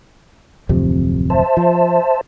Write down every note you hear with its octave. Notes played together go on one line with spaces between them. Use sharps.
D1 F2 C3
C5 E5 A5
F3